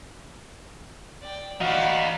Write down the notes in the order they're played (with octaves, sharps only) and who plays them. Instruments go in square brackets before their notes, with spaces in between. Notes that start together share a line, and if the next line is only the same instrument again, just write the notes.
[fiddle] D5 G5
[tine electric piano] E3 [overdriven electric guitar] D#4 F5 [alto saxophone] F#4 [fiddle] D5 B5